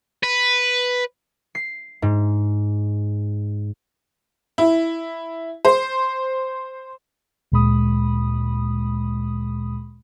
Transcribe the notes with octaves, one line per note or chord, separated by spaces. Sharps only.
B4
C7
G#2
E4
C5
D2 A#2 G#3 B5 D#6